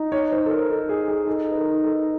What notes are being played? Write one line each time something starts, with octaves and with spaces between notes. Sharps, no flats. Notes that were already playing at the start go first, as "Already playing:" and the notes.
Already playing: D#4
C#5
C5
A4
A#4
D#4 A4
G#4
G#4
D#4 A4
B4
A#4
A4